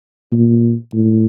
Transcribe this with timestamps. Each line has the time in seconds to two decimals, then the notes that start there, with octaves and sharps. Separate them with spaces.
0.32 A#2
0.93 A2